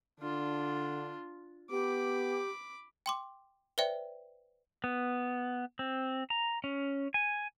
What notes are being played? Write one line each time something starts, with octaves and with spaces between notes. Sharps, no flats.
D3 D4 F4
B3 G4 B5 D6
G5 C6 D6
B4 C5 D5 E5 G5
B3
C4
A#5
C#4
G#5